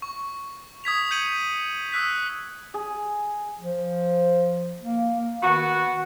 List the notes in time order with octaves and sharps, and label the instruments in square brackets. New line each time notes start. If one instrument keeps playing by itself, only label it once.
[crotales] C#6
D#6 G#6 B6 F7
G6 G#6 C#7 D#7 F#7
D#6 E6 F#6 B6
[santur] G#4
[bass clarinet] F3
A#3
A#3
[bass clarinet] D#3 [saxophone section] B3 F#4